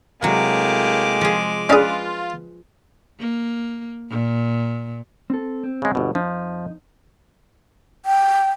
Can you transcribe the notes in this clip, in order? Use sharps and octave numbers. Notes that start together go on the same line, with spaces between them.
A2 C3 F#3 G#3 A#3 G4 D6
F3 G#4
C#4 D4 F4 G#4 B4 F5
A#3
A#2
C4 A4
C4
C#3 G#3
G1 B2
F2 F3 D#4
G5